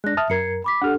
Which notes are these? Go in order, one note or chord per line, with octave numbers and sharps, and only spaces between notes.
G#3 D4 F#6 A#6
E5 A5 D#6 F6
F#2 A#4 G#6 C7 C#7
B5 D6 B6
D4 G4 A4 F#5 F6